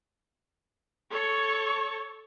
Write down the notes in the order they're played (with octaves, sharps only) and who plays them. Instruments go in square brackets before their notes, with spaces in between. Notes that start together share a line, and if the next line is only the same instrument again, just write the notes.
[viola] A4 C#6 [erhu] C#5